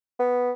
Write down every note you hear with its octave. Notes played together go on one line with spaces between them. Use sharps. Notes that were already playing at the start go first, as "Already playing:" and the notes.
B3